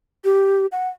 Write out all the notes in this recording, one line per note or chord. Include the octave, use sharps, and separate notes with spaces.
G4
F#5